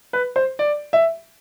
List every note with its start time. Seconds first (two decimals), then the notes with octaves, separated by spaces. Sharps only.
0.13 B4
0.36 C5
0.59 D5
0.93 E5